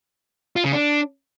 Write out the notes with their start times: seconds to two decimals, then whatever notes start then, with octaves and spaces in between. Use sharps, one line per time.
0.56 F4
0.64 C#3
0.73 D4